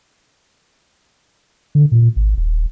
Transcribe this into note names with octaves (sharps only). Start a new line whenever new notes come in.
D3
A#2
G#1
D#1